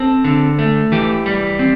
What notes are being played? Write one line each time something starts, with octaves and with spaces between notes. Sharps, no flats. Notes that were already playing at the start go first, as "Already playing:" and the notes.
Already playing: C4 A4
D3
A3
E3 G4
G3
C4